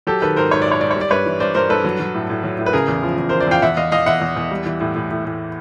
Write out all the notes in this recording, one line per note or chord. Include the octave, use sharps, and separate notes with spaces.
F#3 G4 A4
D#3 A4 B4
G#2 A#4 C5
G#2 C#5
G#2 D5
C#5
G#2 D5
C#5
G3
D5
G2 B4 C#5
E3
G2 C5 D5
G2 A#4 C5
G2 A4 B4
F#3
F#3
A2
A2
F#3
A2
B4
C#3 G#4 A#4
E2
F3
E2
F3 A#4 C5
C5 D5
E2 F5 G5
E2 E5 F#5
E2 D#5 F5
E2 D#5 F5
E2 E5 F#5
E2
E2
G3
E3
A2
A2
A2
A2